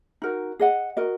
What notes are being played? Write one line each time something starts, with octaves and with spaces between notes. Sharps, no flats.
D#4 F#4 A#4
G#4 D#5 F#5
F#4 A#4 D#5